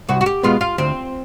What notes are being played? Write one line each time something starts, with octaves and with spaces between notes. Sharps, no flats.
C2 F#4
F#4
G4
B2 G#3 B3 F4
F4
D2 C4